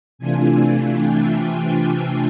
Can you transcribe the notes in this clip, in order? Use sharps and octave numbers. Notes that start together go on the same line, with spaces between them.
C3 E3 A3 D4 F4 G#5
G5
G5